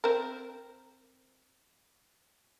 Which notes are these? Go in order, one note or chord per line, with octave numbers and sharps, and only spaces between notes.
C4 A#4